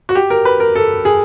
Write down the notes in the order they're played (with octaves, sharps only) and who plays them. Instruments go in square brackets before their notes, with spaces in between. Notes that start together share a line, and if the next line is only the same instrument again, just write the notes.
[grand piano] F#4
G4
A#4
B4
A#4
A4
G#4